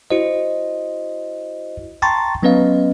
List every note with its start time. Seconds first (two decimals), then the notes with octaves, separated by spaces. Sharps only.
0.10 E4 F#4 C5 D#5
2.02 G5 A5 A#5 C6 C#6 A6
2.43 F#3 B3 C#4 B4 D#5 F5